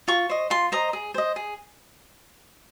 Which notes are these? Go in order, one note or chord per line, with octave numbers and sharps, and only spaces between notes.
F4 C#6
C5 D#5
F4 C6
C5 D#5 A#5
G#4
C5 D#5
G#4